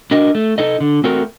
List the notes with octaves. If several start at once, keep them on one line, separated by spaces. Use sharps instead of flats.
D4 F#4 A#4 D#5
A3
D#4 A4 D#5
D3
A3 C4 F#4 A#4